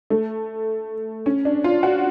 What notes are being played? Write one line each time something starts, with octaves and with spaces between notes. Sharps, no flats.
A3
C#4
D4
F4
F#4